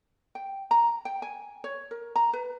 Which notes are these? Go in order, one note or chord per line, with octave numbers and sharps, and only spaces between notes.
G5
A#5
G5
G#5
C#5
A#4
A#5
B4